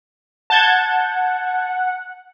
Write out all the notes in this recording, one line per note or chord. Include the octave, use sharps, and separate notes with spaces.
F#5 A5 G6 G#6